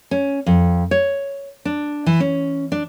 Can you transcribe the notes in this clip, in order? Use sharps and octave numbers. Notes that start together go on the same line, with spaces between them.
C#4
F2
C#5
D4
E3
C#4
D4